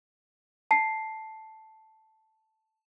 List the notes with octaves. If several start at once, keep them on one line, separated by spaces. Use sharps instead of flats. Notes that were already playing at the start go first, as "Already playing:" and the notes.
A5 C7